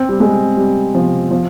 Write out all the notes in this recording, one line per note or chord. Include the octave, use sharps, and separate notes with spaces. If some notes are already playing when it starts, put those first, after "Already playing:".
Already playing: C4
G3
G#3
G3
F3
F3